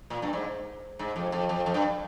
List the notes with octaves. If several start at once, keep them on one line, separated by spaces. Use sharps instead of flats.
A#2
G2
G#2
G#2
F2
F2
F2
F2
G2